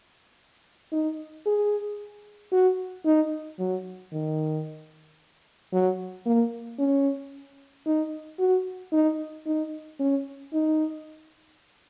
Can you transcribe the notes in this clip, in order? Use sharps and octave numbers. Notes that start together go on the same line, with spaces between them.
D#4
G#4
F#4
D#4
F#3
D#3
F#3
A#3
C#4
D#4
F#4
D#4
D#4
C#4
D#4